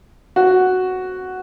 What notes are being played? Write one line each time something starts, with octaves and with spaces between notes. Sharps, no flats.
F#4